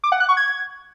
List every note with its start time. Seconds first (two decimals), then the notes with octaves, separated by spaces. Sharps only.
0.04 D6
0.12 F#5
0.20 F#6
0.29 C#6
0.37 G#6